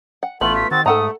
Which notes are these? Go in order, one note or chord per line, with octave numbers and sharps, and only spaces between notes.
F#5
A1 A3 B3 F4 F#7
B6
D#3 C4 F#4 A6
G#2 A3 A4 F#5 A#5 D#6